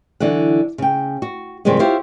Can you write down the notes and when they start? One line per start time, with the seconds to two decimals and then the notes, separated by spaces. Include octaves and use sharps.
0.20 D3 E3 F#3 F#5
0.78 C#3 G5
1.22 F#4
1.65 G2 C3 D#3 F3 G3 G#3
1.79 E4 F4 G4 C5 C#5 F5